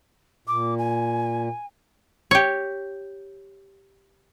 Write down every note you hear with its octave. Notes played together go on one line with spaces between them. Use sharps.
A#2 D6
G#5
G4 C#5